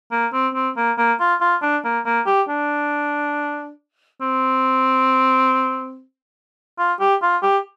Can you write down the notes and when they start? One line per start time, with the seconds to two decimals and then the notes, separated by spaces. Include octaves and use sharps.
0.12 A#3
0.33 C4
0.54 C4
0.77 A#3
0.98 A#3
1.20 F4
1.41 F4
1.62 D4
1.85 A#3
2.06 A#3
2.26 G4
2.49 D4
4.21 C4
6.79 F4
7.00 G4
7.22 F4
7.43 G4